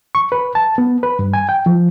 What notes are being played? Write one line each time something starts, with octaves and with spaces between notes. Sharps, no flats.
C#6
B4
A5
B3
B4
G2
G#5
G5
F3